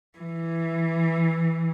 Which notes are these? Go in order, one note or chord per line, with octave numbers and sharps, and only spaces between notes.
E3